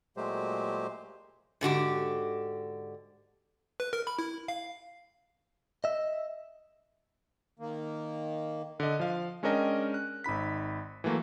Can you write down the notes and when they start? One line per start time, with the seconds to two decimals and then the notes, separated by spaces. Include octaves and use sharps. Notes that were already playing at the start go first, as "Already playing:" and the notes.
0.17 A#2 F#3 G#3 A3 G4 C5
1.61 G#2 D3 F#4 G4
3.80 B4
3.93 A#4
4.07 B5
4.19 E4
4.48 F5
5.84 D#5 E5
7.59 D#3 A#3
8.80 D3 D#5
9.00 F3 F5
9.43 G#3 C#4 D4 A#4 D#5 G5
9.94 F#6
10.24 G#1 D#4 B5 B6
11.04 E3 F#3 A3 A#3